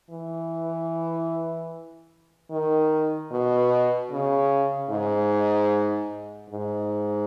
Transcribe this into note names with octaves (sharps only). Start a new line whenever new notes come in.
E3
D#3
B2
C#3
G#2
G#2